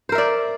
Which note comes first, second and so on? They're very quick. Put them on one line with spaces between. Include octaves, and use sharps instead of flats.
C5 A#4 E5 D5